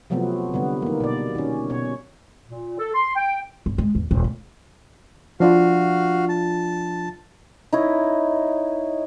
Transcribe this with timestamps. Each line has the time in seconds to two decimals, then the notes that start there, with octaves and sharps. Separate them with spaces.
0.10 C3 F3 F#3 A3 B3 C4
0.54 D3 G3 B3
0.82 D#3 A#3
1.00 B2 D5
1.35 D#3 C#4
1.70 B2 C#5
2.46 A#2
2.79 A4
2.94 C6
3.16 G5
3.66 G1
3.78 G#3
3.95 E2
4.11 D#1
4.24 A3
5.40 F3 D4 F4 F#4 F5
6.29 A5
7.72 D#4 E4 C#5